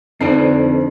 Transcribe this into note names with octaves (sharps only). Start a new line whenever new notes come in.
F2 D3 D#4 B4 D5 C7